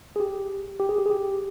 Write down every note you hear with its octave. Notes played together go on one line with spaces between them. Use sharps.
G#4
G4
G4
G#4
G4
G#4
G4